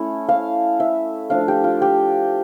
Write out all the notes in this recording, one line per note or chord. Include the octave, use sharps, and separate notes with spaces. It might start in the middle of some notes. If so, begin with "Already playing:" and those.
Already playing: A3 C#4 E4
F5
E5
F3 A3 D4 F5
G4
F4
G4